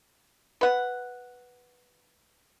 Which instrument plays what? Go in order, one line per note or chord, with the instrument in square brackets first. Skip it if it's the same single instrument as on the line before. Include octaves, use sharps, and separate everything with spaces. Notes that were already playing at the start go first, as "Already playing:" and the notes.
[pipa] B4 F#5